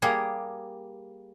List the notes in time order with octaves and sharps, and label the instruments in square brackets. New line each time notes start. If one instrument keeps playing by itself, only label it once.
[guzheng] G3 A#3 G4 G#4